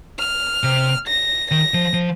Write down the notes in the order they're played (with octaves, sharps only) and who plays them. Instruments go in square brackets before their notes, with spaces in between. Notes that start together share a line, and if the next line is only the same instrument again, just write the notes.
[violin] F6
[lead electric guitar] C3
[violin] A#6
[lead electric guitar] D#3 [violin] A#6
[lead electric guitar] F3
F3